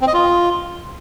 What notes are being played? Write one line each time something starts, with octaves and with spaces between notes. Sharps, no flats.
C4
D#5
F4